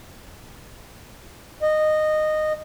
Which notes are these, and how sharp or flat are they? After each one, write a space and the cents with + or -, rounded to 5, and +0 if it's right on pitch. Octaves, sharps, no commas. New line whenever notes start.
D#5 -15